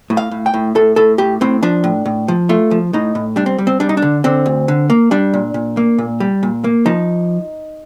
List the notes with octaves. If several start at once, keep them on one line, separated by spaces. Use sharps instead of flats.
A2
F5
A2
G5
A2
A2 A4
A2 A4
A2 G4
A2 C4
F3 D4
A2
A2
F3
A3 F4
F3
A2 D#4
A2
G3 D4
C4
G3
C4
G3 D4
D#4
D4
D3
D3 C4
D2
D3
A#3
G3 D4
A#2
A#2
A#3
A#2
G3
A#2
A#3
F3 D#4